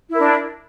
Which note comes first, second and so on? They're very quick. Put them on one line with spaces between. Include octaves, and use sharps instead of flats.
E4 A#4 D4